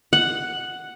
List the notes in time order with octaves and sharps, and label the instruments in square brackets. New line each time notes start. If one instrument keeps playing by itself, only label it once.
[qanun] F#5